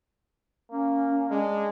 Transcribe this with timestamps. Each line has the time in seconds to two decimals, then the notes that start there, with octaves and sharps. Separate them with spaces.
0.72 A#3 C#4
1.31 G#3 D4